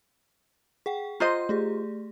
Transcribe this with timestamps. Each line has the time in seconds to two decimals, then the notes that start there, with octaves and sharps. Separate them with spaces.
0.86 G#4 F#5 G5
1.20 F4 C5 D#5 A#5 G6
1.49 A3 G4 G#4